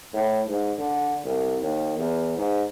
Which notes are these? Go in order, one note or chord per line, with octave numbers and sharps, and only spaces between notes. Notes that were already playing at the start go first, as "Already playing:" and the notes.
A2
G#2
D3
C2
D#2
E2
G#2